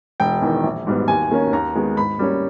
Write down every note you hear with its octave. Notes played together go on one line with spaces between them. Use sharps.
E1 G5
E2 D#3
A#1
G#2 G3 B3
D#2 G#5
D#3 A#3 C#4
D#2 A#5
D#3 G#3 B3
G#2 B5
G3 A#3 C#4